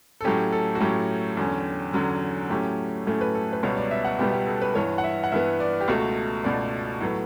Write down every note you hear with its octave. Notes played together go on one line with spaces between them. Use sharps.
A4
A2 F#3 A3 C#4 G4
A4
F#4
A2 F#3 A3 C#4 G4
E2 D3 F#3 C#4
E2 D3 F#3 C#4
A2 F#3 A3 C#4 G4
A2 F#3 A3 C#4
B4
A4
B4
C#2 B2 G3 B3 C#5
D5
E5
F#5
C#2 B2 G3 B3 G4
G4
A4
B4
G2 E3 B3 C#5
F#5
E5
F#5
G2 E3 B3 E5
D5
G4
C#2 B2 A3 F#4
C#2 B2 A3 D5
A2 F#3 B3